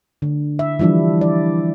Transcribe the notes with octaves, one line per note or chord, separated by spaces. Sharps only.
D3
E5
E3 F3 G3 D4 E4
D5